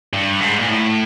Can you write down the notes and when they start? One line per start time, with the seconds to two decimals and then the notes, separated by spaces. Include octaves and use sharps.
0.13 G2
0.40 G#2
0.59 A#2
0.68 A2